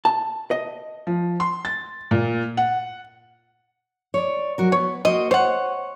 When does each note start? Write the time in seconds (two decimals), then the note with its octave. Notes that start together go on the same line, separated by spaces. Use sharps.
0.05 A5
0.51 D#5
1.07 F3
1.40 C6
1.65 A6
2.11 A#2
2.57 F#5
4.14 C#5 D5
4.58 F#3 F#4 A#4
4.72 B3 C#5
5.05 A#3 F#4 C5 D#5
5.31 C5 C#5 F#5